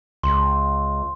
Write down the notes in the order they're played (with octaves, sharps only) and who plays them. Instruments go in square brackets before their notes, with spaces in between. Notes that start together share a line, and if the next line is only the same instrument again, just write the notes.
[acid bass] C#2 [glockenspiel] C6